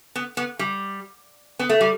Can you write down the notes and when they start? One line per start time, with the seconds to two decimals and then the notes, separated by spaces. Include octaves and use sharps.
0.16 B3
0.37 B3
0.59 G3
1.59 B3
1.69 A3
1.81 G3